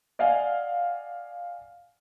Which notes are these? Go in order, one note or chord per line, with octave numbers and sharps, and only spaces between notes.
D5 D#5 F5 F#5 G#5